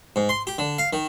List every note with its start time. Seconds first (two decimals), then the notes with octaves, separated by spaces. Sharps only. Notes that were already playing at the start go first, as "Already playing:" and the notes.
0.16 G#2
0.29 C6
0.47 G4
0.58 D3
0.78 F5
0.93 D#3